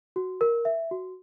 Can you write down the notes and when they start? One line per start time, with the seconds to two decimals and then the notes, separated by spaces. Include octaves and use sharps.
0.16 F#4
0.41 A#4
0.65 E5
0.91 F#4